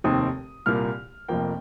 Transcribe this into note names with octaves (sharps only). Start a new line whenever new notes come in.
F1 D#2 D#3 C4 D#6
C2 A#2 A#3 F6
F1 F2 F3 A#3 G5